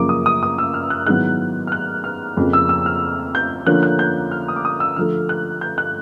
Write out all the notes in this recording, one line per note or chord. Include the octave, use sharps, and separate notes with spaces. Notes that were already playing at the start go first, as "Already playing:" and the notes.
Already playing: F#2 C#3 F3 A#3 D6
D#6
D#6
D#6
E6
F6
F#6
G#2 D#3 F#3 B3 E4 F#6
F6
F#6
F6
F2 C#3 F3 A#3
E6
E6
F6
G6
D3 F3 A#3 C#4 F#6
F#6
G6
F6
D#6
D6
D#6
E6
D3 F3 A3 F6
F#6
G6
F#6